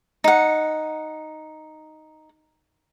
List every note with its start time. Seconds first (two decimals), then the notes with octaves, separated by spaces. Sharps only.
0.24 D#4 F#5